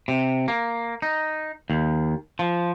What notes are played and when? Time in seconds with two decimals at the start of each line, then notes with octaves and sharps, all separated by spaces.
0.08 C3
0.48 A#3
1.02 D#4
1.70 D#2
2.39 F3